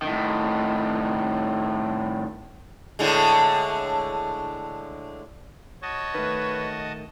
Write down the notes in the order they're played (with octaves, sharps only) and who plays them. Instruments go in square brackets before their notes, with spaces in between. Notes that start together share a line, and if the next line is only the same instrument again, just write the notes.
[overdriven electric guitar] A2 D#3
[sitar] A2 D3 G#3
[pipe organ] F#4 D#5 A5 [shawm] C#5
[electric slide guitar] D#3 A3 [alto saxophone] B4